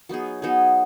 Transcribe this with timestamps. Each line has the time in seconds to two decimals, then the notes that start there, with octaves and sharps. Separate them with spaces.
0.09 F#3 B3 D#4 G#4
0.42 F#3 B3 D#4 G#4